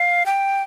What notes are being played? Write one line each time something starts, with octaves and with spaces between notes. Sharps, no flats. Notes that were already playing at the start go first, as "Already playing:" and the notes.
Already playing: F5
G5